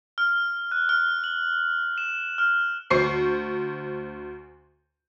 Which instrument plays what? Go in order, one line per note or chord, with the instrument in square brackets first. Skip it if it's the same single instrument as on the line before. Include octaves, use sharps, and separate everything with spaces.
[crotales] F6
F#6
F6
F#7
E7
F6
[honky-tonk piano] D2 C5 C#6 C7